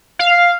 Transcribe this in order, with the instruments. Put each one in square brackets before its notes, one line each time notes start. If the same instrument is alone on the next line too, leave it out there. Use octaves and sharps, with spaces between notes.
[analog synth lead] F5